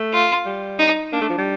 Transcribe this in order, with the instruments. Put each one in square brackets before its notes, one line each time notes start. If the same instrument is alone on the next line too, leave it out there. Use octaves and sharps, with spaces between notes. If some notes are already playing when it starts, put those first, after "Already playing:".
Already playing: [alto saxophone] A3
[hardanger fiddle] F4
[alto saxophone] G3
[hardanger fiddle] D#4
[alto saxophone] A#3 [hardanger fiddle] D4
[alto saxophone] A3
F3
G3